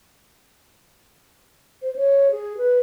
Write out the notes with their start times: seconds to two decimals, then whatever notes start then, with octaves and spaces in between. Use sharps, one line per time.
1.82 C5
1.96 C#5
2.31 G#4
2.57 B4